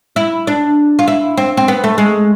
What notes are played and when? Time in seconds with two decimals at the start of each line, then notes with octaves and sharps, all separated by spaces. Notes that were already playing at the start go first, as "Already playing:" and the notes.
0.16 E4
0.47 D4
0.99 F4
1.08 E4
1.37 C4
1.57 C4
1.68 B3
1.84 A3
1.98 G#3